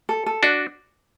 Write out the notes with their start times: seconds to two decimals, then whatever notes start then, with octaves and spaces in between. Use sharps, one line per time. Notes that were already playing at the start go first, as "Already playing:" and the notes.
0.09 A4
0.26 A4
0.43 D4 F#4 D5